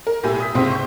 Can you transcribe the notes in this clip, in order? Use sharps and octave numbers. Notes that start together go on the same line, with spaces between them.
A#4
B1 A2 G4 G#5 E6
D#6 B6
G#1 C#2 C3 C4 C6
C#6 G6